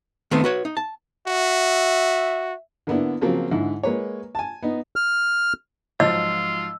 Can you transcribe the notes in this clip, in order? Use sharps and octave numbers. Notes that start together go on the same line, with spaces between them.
D#3 A3 B3 C4
F#4 B4 C#5
D#4
A5
F#4 E5
D3 A#3 B3 D4 E4
C#3 F3 F#3 A#3 C4
G#2 D3 E4
G#3 A#3 B4 C#5
G#5 A5
B3 D#4
F6
G#2 F3 F#3 F4 D#5 E6